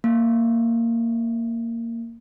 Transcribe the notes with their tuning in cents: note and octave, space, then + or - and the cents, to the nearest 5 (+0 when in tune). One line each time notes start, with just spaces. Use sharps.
A#3 -15